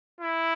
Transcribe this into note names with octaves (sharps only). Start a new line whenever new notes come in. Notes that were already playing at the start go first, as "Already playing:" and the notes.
E4